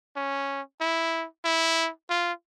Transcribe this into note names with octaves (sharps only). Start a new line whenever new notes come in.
C#4
E4
E4
F4